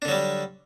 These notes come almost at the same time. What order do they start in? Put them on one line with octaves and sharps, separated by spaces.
D4 D3 F#3 G3